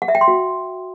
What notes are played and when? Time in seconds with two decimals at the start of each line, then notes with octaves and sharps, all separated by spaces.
0.02 F#5
0.08 E5
0.15 G5
0.21 C6
0.28 F#4